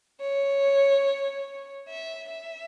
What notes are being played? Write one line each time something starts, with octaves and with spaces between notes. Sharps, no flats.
C#5
E5
E5